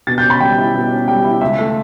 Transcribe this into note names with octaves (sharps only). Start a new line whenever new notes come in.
B2 A6
G6
C#4
B5
G3 G5
E4
B2
C#4
G3 G5
E4
C#2 E5
A3